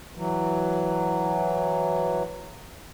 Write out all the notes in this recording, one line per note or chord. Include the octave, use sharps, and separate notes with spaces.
E3 F#3